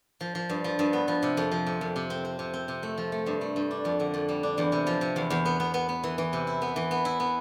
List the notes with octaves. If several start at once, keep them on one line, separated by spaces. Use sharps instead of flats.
F3
F3
G2
F3
G2
B3
F3
C3
F2
F3
C3
F2
C3
C4
C4
C3
C4
C3
A3
F3
A3
G2
A3
G2
D4
F2
D3
F2
G3
D4
E2
C3
F3
C3
E2
E2
B3
B3
B3
B3
E3
E3
C3
E4
B3
E3
B3
E4
B3